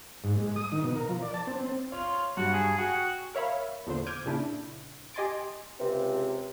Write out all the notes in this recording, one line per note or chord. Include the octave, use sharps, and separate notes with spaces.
G#2
G#3
D#6
D#3
B2
A#4
F3
D5
A5
C4
C4
F4 C#5 F7
G2 F#4
G#4
F#4 G#4 G5
A#4 C#5 E5 F5 B5
E2 A#2 D3 C5
D6 F6 G6 G#6 D7 D#7
A#2 C#3 D4 E4
G4 D#5 G#5 C6 A6 D7
C#2 C3